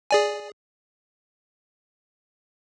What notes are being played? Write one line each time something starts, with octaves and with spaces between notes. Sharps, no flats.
G#4 D5 G#5